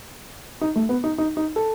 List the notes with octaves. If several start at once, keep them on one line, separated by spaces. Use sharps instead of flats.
D#4
A3
B3
D#4
D#4
D#4
A4